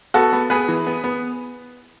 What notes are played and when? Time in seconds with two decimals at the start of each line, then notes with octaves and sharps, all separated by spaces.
0.14 B3 F#4 A4
0.33 B3
0.50 B3 G#4 B4
0.68 E3
0.87 B3
1.04 B3